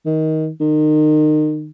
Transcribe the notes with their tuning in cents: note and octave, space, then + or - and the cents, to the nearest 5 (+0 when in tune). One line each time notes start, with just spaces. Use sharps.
D#3 +15
D#3 -30